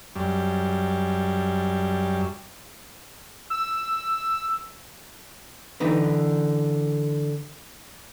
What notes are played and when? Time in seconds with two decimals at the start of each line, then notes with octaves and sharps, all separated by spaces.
0.15 F#2 G3
3.50 E6
5.80 D3 E3 D#4 B4